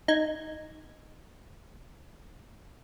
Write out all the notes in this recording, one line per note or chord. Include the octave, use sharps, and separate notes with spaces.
D#4 G#6